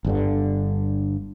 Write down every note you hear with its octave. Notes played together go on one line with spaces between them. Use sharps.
G1 G2 D3